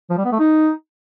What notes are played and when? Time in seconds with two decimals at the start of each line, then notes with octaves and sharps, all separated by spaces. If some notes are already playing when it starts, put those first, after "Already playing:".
0.10 F3
0.17 G3
0.25 B3
0.32 A3
0.39 D#4